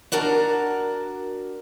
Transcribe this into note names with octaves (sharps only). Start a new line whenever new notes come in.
D4 F#4 A#4 A5